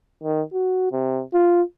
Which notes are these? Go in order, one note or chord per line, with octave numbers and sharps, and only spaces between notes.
D#3
F#4
C3
F4